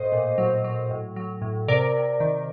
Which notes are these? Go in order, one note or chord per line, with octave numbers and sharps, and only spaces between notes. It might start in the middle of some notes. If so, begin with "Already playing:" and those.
Already playing: A2 C5 D#5
A#2
F#3
F#3
A2
F#3
A2
C3 A#4 D5
C3
D#3